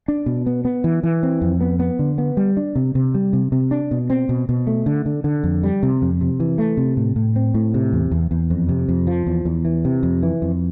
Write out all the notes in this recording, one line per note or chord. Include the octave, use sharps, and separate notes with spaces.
D4
B2
B3
B3
E3
E3
C4
F2
B3
B3
D3
B3
G3
D4
C3
C3
G3
C3
C3
D4
B2
C4
B2
B2
A3
D3
D3
D3
F2
G3
C3
F2
C3
E3
A3
C3
A2
A2
C4
A2
C3
E2
E2
E2
F2
C3
F2
F3
E2
E2
E3
C3
F2
E3
F2